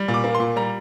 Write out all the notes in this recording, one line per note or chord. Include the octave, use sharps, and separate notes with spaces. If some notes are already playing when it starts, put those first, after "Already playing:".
Already playing: G3
A#2
D6
A#3
C6
A#2
G3 A#5